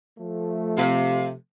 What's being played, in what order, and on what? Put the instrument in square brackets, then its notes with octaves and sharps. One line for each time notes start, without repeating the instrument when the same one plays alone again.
[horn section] F3 A3
[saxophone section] C3 [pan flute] F5